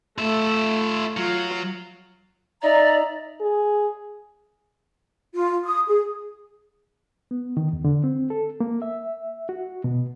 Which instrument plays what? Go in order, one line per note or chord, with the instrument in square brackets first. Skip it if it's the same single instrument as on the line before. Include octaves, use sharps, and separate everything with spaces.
[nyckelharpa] A3 [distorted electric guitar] F4 E5
[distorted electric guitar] F#3 [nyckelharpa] F4
[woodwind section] D#4 E5 A#5 [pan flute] D5
[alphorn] G#4
[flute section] F4
D#6
G#4
[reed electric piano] B3
D#3
E2
D3
C4
A4
A#3
E5
F#4
B2